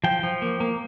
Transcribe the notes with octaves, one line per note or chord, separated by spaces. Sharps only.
F3 G5
F3
A#3
A#3